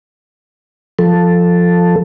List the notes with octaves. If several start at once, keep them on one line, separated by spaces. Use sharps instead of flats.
F3 A4